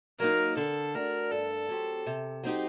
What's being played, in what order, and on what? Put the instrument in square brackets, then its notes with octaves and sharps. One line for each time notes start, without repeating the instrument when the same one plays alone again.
[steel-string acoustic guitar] F#3 A#3 D#4 [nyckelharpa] A#4
[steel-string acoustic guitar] D3 [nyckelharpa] A4
[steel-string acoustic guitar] A3 D4 F#4 [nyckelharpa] A#4
[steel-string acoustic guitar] G2 [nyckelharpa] A4
[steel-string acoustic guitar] F#3 C4 G4
C3
F#3 C4 D#4 G4